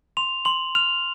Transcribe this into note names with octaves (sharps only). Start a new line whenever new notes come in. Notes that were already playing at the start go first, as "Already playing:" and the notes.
C6 F7
C6 F#7
F6 F7